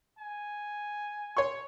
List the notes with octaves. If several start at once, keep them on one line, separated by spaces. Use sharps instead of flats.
G#5
C#5 C6 C#6